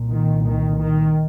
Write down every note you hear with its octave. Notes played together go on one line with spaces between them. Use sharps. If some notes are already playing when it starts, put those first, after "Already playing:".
Already playing: C2 A#2
D#3
D#3
D#3